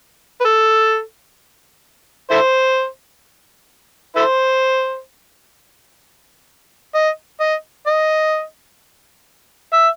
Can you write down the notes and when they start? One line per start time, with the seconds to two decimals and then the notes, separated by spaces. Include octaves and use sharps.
0.41 B4
0.44 A4
2.31 E4 A4 C5
4.16 E4 A4 C5
6.95 D#5
7.40 D#5
7.87 D#5
9.73 E5